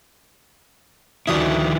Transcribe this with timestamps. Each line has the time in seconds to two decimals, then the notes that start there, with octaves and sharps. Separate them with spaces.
1.27 D2 D#3 F3 E4 D#6